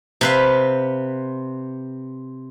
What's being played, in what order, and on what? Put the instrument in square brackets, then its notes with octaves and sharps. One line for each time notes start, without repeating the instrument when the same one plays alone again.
[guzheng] C3 B4 F5